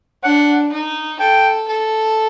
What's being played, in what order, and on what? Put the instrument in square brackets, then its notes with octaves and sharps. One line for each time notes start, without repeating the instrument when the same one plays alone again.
[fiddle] D4 [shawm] F#5
[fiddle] D#4
[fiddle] A4 [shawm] G5
[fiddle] A4